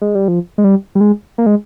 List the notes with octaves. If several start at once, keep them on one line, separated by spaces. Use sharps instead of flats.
G#3
G3
F3
G#3
G3
G3
G#3
A#3
G#3